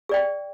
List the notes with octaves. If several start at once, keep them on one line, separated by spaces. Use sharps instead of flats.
G#4 D5 G5